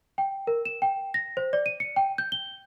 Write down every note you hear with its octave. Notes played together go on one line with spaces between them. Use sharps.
G5
A#4
E7
G5
A#6
C5
D5
D#7
C#7
G5
G6
G7